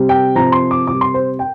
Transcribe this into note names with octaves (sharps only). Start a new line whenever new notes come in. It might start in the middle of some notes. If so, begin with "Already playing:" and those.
Already playing: C3 G3
G5
C3 F3 A#5
C6
D6
C3 G3 D6
C6
C5
G5